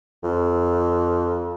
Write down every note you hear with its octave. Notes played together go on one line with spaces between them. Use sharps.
F2